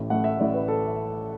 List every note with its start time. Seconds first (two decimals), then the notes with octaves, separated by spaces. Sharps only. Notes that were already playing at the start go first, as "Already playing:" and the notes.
Already playing: A1 A2 A3
0.10 A1 A2 A3 F#5
0.24 E5
0.38 A1 A2 A3 D5
0.53 B4
0.68 A4